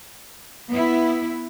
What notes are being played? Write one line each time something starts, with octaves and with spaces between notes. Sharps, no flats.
B3 E4